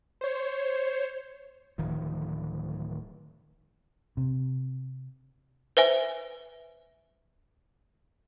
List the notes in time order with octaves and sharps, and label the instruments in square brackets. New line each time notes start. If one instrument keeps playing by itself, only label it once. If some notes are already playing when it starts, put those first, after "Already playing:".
[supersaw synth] C5 C#5
[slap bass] D1 D#3 F3
[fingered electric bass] C3
[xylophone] B4 C5 E5 G#5